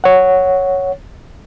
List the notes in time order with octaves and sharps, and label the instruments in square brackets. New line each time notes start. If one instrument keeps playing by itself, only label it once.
[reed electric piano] C#5 F#5